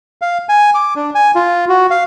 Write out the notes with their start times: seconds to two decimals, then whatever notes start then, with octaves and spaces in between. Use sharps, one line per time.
0.22 F5
0.49 G#5
0.75 D6
0.96 D4
1.15 G#5
1.35 F4
1.69 F#4
1.91 F5